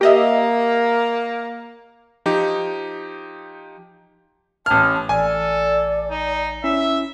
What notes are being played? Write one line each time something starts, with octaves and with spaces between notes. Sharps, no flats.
A#3 G4 D#5 E5
F3 D#4 G4
A1 A5 F6
A1 A4 D5 G#5
D#4
C#4 E4 E5